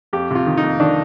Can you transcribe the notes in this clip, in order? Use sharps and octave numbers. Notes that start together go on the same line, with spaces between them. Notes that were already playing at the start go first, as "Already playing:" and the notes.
F2 G4
C3 F4
D#3
D#4
F2
D#3 D4